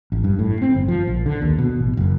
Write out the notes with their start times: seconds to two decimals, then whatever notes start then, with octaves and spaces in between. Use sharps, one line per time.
0.12 A1
0.24 G2
0.39 A2
0.62 C4
0.74 G1
0.88 F3
1.07 A#1
1.26 D3
1.42 D#2
1.58 B2
1.79 A1
1.97 F#1